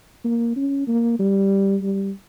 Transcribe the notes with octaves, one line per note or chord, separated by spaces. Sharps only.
A#3
C#4
A#3
G3
G3